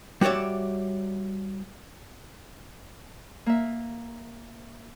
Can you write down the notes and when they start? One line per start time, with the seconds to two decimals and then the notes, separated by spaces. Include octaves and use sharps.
0.21 G3 F#4 C#5 D5 E5
3.46 A#3 E5